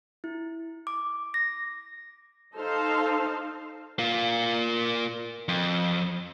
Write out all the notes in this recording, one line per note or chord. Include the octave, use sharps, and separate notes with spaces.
E4
D6
A#6
D#4 A4 C5 F5
A#3 F4
F2